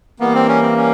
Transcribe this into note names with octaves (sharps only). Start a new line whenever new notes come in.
E3 G3 A#3 B3
C4
C#4
C4
C#4